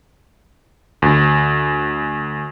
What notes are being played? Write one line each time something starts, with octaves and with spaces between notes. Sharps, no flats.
D2